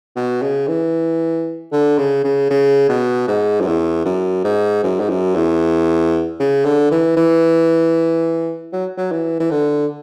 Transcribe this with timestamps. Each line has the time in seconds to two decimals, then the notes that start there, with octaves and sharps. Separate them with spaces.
0.16 B2
0.42 C#3
0.68 E3
1.72 D3
1.98 C#3
2.24 C#3
2.50 C#3
2.89 B2
3.28 G#2
3.61 F#2
3.67 E2
4.05 F#2
4.44 G#2
4.83 F#2
5.00 G#2
5.10 F#2
5.35 E2
6.40 C#3
6.65 D3
6.91 E3
7.17 E3
8.73 F#3
8.97 F#3
9.12 E3
9.40 E3
9.51 D3